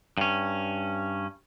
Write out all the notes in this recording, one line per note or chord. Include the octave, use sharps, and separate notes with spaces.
G2 C#4